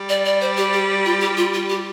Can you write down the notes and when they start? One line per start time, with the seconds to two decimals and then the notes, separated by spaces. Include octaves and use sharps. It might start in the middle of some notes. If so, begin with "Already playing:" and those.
Already playing: G3
0.09 D5
0.25 D5
0.41 C5
0.57 G4
0.73 G4
1.06 F4
1.21 G4
1.37 F4
1.54 F4
1.69 G4